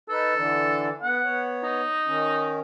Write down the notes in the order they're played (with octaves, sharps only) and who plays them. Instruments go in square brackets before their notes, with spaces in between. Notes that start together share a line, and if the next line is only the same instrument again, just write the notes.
[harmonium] D#4 B4 [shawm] A4
[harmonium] D3 E3 D4
[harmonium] B3 [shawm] F#5
[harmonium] B3 C#5
[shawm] D#4
[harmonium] D#3 C#4